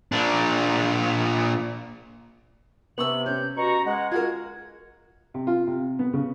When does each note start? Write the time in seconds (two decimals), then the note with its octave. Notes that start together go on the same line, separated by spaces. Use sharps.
0.12 A#2 D4
2.98 C3 B3 C#6 E6 F#7
3.26 C#4 G6
3.57 B2 F#4 A#5 C#6
3.86 G#3 F#5
4.11 F4 F#4 A#4 G#6
5.34 C3
5.47 F4
5.67 C3
5.99 B3
6.14 C#3